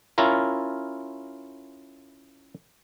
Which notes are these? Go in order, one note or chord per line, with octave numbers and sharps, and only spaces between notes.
C#4 E4 F4 A#4